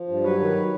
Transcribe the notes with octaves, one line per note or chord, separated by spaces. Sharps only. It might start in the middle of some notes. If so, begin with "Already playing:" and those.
Already playing: F3
G2
F#3 B4 C#5
D#3